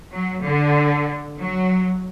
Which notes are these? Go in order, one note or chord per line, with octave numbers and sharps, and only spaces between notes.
F#3
D3
F#3